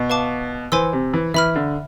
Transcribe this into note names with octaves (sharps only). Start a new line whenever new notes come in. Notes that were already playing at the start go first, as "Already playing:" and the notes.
Already playing: B2
B4 F5 A5 D6
E3 C5 G#5 C6 E6
C3
E3
E3 E5 B5 F6
D3